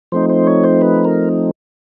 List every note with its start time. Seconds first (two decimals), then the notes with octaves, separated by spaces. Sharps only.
0.12 F3 A3 C4 D#4 C5
0.29 C5
0.47 C#5
0.64 C5
0.81 B4
1.05 A#4